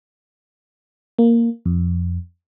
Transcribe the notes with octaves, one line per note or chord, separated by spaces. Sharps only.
A#3
F2